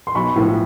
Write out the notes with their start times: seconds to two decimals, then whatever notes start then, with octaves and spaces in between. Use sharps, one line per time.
0.07 C6
0.15 B1 B5 C#6
0.36 A2 F3